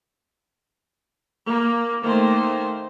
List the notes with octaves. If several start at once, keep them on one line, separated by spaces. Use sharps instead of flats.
A#3
D#3 A3 A#3 C5